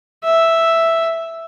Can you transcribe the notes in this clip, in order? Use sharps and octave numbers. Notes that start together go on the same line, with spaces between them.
E5